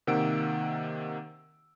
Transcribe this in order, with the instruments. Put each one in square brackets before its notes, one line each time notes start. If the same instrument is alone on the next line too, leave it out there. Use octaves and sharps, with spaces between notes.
[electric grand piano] C3 D#3 A#3 F#5 E6 D7